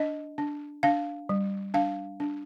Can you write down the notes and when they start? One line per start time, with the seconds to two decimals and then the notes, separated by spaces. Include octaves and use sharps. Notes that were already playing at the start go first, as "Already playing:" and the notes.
Already playing: D4 D#5
0.38 D4
0.83 D4 F5
1.29 G3
1.74 D4 F5
2.20 D4